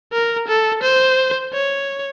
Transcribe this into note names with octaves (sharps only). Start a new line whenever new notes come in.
A#4
A4
C5
C#5